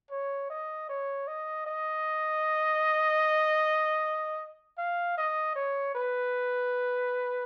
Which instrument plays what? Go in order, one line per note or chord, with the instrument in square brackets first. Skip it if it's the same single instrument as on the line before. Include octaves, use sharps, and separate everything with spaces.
[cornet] C#5
D#5
C#5
D#5
D#5
F5
D#5
C#5
B4